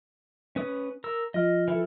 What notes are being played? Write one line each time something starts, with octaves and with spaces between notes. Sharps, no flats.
C#4 B4 D#6
A#4 E6
F3 F4 D#5 F6
E3 A4